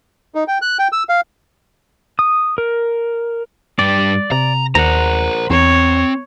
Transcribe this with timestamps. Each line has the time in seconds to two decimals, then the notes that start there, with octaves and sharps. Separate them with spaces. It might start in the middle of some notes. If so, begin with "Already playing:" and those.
0.35 D#4
0.48 G5
0.62 F#6
0.79 G5
0.92 E6
1.09 F5
2.19 D#6
2.58 A#4
3.79 G2 G4 D5
4.31 C3 A#5
4.75 D#2 A#4 C5 F#5 A#5
5.50 E2 C4 C#5